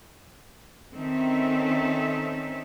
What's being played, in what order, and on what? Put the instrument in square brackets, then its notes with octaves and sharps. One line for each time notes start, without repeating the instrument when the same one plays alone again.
[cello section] D#3 C4 C#4 A4 E5